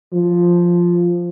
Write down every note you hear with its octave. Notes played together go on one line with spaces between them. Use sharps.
F3